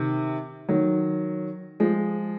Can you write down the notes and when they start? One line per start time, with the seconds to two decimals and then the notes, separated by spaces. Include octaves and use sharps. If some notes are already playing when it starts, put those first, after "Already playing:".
Already playing: C3 D#3
0.69 D#3 F#3
1.80 F3 G#3